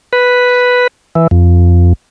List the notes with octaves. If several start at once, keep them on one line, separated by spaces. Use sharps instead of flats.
B4
E3
F2